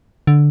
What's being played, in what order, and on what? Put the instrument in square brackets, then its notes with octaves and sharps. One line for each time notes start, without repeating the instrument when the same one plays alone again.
[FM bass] D3